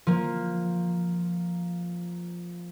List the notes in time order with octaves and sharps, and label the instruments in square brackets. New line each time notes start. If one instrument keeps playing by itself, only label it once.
[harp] F3 A#3